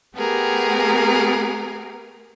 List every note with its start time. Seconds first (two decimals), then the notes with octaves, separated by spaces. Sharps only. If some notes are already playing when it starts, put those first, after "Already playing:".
0.16 A3 B3 G4 G#4 A#4